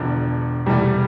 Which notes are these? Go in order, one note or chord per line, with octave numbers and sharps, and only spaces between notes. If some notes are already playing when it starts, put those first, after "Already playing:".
Already playing: E1 E2 D3 F3
E1 E2 C3 E3 G3 A3